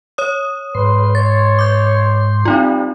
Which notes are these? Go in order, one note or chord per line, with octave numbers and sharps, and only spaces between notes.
C#5 D#6
G#2 B4 C6
C#5 A6
D6 G6
G3 C4 D#4 F4